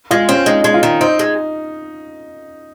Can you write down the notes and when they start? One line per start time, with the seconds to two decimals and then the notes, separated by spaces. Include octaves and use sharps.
0.11 G#3 F4
0.29 C4 C#4
0.46 G#3 D#4
0.64 G#3
0.74 F4
0.83 D#3
1.01 C4 D#4
1.19 G#3